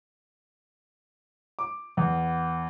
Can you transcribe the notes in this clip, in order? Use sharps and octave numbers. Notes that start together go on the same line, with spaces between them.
D6
E2